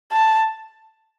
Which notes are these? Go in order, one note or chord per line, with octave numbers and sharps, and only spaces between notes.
A5